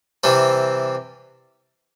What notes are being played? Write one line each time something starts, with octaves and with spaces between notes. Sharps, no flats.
C3 E3 G3 C4